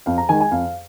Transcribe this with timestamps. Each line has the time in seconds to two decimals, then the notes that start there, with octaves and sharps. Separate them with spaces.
0.06 F2 F5
0.18 A#5
0.29 D#3 G#3 G#5
0.41 G#5
0.51 F2 F5